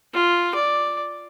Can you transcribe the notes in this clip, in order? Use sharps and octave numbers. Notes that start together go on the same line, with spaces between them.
F4
D5